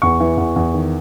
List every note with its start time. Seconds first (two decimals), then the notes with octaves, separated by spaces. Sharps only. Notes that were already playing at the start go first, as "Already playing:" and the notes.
0.02 E2 C#6
0.20 E3
0.37 E2
0.56 E2
0.74 D#3